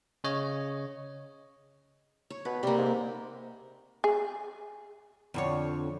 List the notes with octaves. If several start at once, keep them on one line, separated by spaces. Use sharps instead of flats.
C#3 C#5 D#5
C#5
B2 B4
C3 G3 A#3
G#2
G#4
F2 D3 C#5